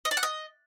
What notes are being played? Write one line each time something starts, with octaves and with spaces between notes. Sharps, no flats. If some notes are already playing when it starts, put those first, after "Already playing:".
D#5
D5
F#5
D#5